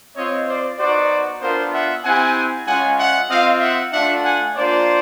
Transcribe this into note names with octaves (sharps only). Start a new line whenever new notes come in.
C4 F4 C#5 D#5
C5 D5
B3 D#4 F#4 C5 D5
B3 D4 F4 A#4 C5
E5 F#5
C4 E4 G4 F#5 G#5
G#3 C#4 F4 F#5 G#5
E5 F#5
C4 F4 D#5 F5
E5 F#5
A3 D4 F4 E5 F#5
F#5 G#5
A#3 D4 F4 C5 D5